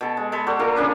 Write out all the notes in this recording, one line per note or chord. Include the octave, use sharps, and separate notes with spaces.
B2 A4
G#3
G#3 A4 B5
F#4 A4 C5 D5
A#3 F4 A4 A#4
C#3 A#3 D4 B4